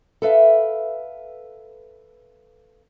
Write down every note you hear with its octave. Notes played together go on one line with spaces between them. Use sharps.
A4 B4 E5 F5